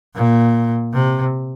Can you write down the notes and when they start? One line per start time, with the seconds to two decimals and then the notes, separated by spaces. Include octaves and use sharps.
0.15 A#2
0.93 C3